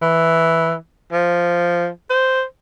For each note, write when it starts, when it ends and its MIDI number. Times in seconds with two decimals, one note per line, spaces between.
0.02 0.74 52
1.12 1.88 53
2.10 2.43 72